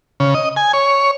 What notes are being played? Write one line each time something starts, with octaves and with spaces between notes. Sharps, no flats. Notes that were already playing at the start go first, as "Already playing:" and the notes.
C#3
D#5
G#5
C#5